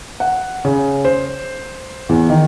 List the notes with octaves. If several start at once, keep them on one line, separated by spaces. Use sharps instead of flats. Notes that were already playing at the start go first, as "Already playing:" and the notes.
F#5
C#3
C5
E2
D#3